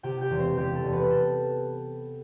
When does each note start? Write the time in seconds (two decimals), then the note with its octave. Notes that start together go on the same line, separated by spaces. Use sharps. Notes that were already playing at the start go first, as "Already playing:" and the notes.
0.03 C3 G4 G5
0.21 G4 G5
0.30 E1
0.39 C4 C5
0.57 E1 G4
0.74 A4
0.84 E1
0.92 B3 B4
1.10 A4